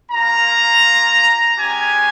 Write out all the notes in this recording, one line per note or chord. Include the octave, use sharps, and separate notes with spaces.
A#3 F4 A#5
G#3 C#4 G4 G#5